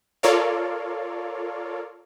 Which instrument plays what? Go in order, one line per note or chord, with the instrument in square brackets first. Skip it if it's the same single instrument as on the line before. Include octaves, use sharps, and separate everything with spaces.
[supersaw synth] F4 A4 A#4 C#5 D5 F5